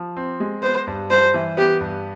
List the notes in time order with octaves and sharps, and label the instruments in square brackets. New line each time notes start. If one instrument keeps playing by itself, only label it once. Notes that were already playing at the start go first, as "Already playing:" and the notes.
Already playing: [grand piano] F3
C4
G#3
[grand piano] B3 [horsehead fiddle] C5
[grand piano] G2
[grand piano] G3 [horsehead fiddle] C5
[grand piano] E3
[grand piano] B3 [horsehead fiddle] G4
[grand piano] G2